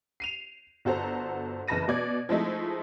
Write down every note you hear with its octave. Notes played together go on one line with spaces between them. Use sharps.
C7 D#7 F7
G1 F#4 A4 C5 A#5
F#1 E3 A5 B5 A#6 D#7
B2 D5 G#6
F3 G#3 A3 D#4 E4